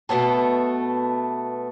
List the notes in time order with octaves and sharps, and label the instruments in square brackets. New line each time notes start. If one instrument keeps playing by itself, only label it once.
[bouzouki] B2 A3 B3 A4